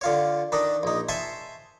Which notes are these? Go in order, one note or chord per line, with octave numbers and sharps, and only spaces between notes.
D3 F4 C#5
D#3 D4 D#4
A#1 D#4
C5 E5 G#5 A5 C6 C#6